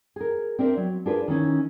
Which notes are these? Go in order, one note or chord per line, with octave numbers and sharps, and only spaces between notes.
G#4 A#4
C4 D4 A#4 E5
F#3
D4 F4 G#4 A#4 B4
D#3 E3 C#4